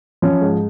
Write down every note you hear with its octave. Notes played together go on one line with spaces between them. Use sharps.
F3 C#4
G#2